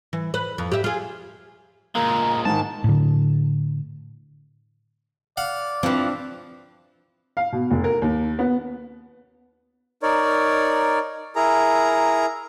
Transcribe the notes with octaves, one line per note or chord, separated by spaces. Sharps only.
E3
B4
F2
G4 E5
F4 G#4
A#2 G#3 A#3 A#4 A#5
G#2 D#3 A5
A2 D3
D5 F5 F#5
E3 F3 C4 D4
F5
B2
F1
A#4
D#2
B3
D#4 A#4 C#5 D5
E4 G#4 A#4 A#5